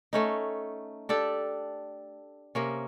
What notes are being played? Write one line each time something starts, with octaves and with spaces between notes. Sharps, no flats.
A3 C#4 D#4
D4 G4 A4 D5
C3 A#3 C#4